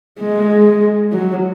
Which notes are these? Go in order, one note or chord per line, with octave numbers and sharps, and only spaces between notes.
G#3
F#3